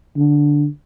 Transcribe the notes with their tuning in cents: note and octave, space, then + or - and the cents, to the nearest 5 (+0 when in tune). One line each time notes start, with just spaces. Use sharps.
D3 -5